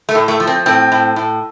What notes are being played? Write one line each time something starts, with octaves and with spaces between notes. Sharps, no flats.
A3
A2
A3
F3
C4
A2 C4
A2
A2